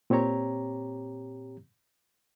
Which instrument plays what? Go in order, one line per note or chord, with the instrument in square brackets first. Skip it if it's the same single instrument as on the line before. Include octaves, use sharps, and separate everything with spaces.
[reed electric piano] A#2 C4 G4 C#5 A#5